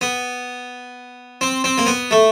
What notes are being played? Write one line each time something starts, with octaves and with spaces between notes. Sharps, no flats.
B3
C4
C4
A#3
B3
A3